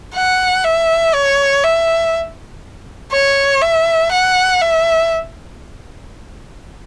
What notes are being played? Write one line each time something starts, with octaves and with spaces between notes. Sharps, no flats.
F#5
E5
C#5
E5
C#5
E5
F#5
E5